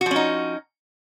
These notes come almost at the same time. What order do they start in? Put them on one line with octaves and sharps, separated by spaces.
F#4 F3 C#4 D#4